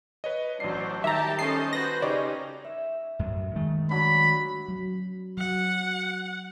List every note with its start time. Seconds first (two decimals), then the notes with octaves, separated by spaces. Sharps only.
0.24 B4 C#5 D#5
0.60 A1 F#3 D4 C5 D5 C7
1.04 D#3 G3 G4 E5 A5 A#5
1.39 C#4 A4 C5 D#5 A5 C7
1.73 F#4 B4 C5 A#6
2.02 C#3 C#4 D#4 G4 D5 D#5
2.65 E5
3.19 F#2 A2
3.56 D#3 G#3 A3
3.90 F#3 D4 B5
4.68 F#3
5.38 F#3 F#5